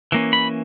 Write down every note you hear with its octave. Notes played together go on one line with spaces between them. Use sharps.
E3 A#3 C#4
B5